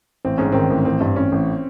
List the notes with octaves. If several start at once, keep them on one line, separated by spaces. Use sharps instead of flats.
A1 C4
G#2 C#4
D#3 C4
A1
A1 C4
G2
A1 C#4
A1